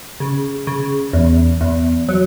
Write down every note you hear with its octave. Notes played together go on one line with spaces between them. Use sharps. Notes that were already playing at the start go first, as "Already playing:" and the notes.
C#3
C#3
E2
E2
F#3